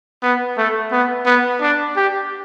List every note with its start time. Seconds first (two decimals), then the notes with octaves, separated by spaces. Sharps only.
0.23 B3
0.57 A3
0.92 B3
1.26 B3
1.61 D4
1.97 G4